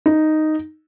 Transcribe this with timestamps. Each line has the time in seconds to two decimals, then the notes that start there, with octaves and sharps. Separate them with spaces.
0.06 D#4